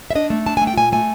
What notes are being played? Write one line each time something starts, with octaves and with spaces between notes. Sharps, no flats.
E5
D4 D#5
A3
D4 A5
G#5
A3
G5
A#2 G#5
A3 G#5